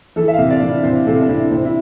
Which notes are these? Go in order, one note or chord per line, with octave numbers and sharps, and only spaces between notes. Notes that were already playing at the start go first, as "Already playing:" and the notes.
E3 A4
E5
F5
C3
D5
C3 D4
E4
C3 C5
C3 A4
D4
C3 E4
C3 C4
E4